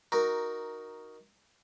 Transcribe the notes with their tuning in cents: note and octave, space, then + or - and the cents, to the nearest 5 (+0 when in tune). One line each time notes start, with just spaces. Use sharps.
D#4 +0 F#4 +0 A#4 +10